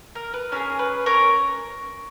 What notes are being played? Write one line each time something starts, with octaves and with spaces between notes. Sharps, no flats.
A#4
B4
C#4 F4 G#4 A#4
B4
A#4 C#5